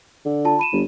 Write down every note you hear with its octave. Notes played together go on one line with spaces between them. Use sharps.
D3
F4 A5
B5 D#7 E7
G1